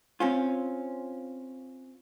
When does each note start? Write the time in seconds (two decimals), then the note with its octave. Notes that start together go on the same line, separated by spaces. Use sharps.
0.20 C4 C#4 F4